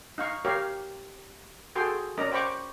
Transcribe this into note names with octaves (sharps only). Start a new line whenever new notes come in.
D#4 F5 C#6
G4 A#4 C#5 F5
F#4 G#4 A4 G5 C6
C#4 A#4 D5 D#5 A#5
C5 G5 A#5 B5 C#6 D6